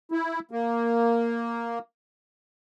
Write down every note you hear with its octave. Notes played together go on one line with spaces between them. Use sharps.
E4
A#3